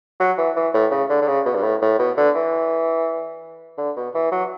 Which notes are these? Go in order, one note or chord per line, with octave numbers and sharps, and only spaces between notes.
F#3
E3
E3
A2
C#3
D3
D3
C#3
B2
G2
A2
A2
B2
D3
E3
D3
B2
E3
F#3